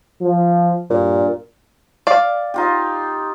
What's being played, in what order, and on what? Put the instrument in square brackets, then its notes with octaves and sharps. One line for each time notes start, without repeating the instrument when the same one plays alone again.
[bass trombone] F3
[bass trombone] G2 [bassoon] A#2
[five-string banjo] D5 F5
[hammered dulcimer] D#4 F4 G4